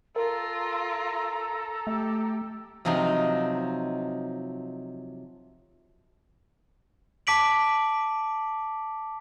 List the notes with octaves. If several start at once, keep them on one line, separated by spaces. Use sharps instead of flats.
F4 A4 A#4 A#5
A3 G4
C3 F3 F#3 C4 D#4
A5 D6 B6 D7 F#7